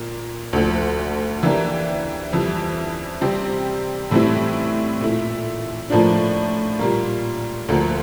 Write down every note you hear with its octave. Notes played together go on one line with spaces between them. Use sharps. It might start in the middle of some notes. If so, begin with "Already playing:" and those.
Already playing: A#2 A#3
D2 D3 F3
E3 A#3 D4 G4
F2 E3 G3
C3 G3 C4 G4
A2 E3 G3 C4 E4
A#2 A3 E4
A2 F3 A#3 D4
A#2 G3 A#3
D2 D3 F3 A#3